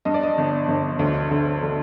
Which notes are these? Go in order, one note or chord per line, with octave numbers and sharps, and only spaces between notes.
G2 D#5
D5
D#5
G1
G1
D2
D3
D3